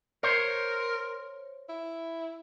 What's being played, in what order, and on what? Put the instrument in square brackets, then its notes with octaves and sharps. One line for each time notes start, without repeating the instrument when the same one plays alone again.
[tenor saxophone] A#4 [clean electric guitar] C5 C#5
[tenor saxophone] E4